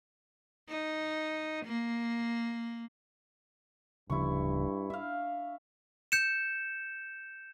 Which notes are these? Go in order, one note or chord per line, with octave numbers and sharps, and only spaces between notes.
D#4
A#3
D1 G2 C#3 F3 E4 C#6
D4 E5 F5
G6 C#7 E7